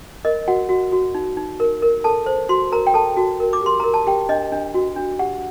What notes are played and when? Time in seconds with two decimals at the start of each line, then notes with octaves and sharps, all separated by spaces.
0.25 A#4 D#5
0.48 F#4 F#5
0.69 F#4
0.92 F#4
1.15 D#4
1.37 D#4
1.60 A#4
1.82 A#4
2.04 A4 A5
2.26 C5
2.49 F#4 C6
2.72 A#4 A#5
2.87 G5
2.94 A4 A5
3.17 F#4
3.40 A#4
3.53 D6
3.62 G4 C6
3.80 A#4 A#5
3.94 A5
4.07 G4 G5
4.29 D4 D#5
4.52 D4
4.74 F#4
4.96 D4
5.19 G4 F#5